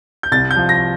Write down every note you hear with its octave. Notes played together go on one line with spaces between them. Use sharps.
G6
C2 A6
G6
F3
A#6